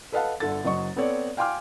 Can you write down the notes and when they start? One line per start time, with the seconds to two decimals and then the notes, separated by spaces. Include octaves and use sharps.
0.12 A4 B4 D#5 F5 F#5 A5
0.40 G1 D3 A4 A6
0.64 F#1 F#3 D#5 C#6
0.96 B3 C4 A4 C#5 D5
1.37 F5 G5 G#5 C6 D6 F6